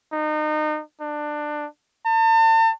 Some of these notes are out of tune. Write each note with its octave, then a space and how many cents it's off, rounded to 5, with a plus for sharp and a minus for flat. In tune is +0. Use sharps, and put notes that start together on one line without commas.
D#4 -30
D4 +20
A5 +40